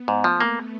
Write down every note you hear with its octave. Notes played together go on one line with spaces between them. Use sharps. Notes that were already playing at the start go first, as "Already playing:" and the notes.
Already playing: B3
G#2
F3 A3
A#3